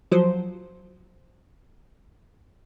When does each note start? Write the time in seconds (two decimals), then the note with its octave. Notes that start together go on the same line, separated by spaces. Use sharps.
0.12 F3 F#3 C5